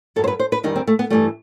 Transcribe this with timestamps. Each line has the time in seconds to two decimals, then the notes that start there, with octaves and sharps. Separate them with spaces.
0.16 G2 F#3 A4
0.24 C5
0.28 B4
0.39 C5
0.52 B4
0.63 E2 D#3 G3 D#4
0.76 C4
0.87 A3
0.99 B3
1.10 G2 E3 G3 A3